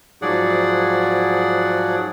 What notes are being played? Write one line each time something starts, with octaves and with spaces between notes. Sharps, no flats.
G#2 F3 F#3 G#4 D5 F#5